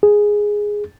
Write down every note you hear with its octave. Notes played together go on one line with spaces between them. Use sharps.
G#4